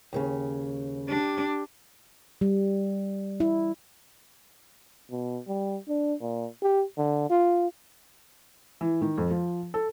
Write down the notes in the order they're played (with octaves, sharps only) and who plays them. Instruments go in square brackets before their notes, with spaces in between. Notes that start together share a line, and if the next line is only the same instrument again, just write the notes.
[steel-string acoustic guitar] D#2 A#2 C#3
[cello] D4 [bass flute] G4
[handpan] G3
E4
[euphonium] B2
G3
D4
A#2
G4
D3
F4
[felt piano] E3
D#3
F2
F3
A4